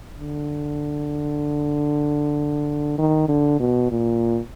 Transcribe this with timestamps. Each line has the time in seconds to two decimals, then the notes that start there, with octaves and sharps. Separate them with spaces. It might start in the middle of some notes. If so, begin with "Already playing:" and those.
0.19 D3
2.98 D#3
3.28 D3
3.60 B2
3.91 A#2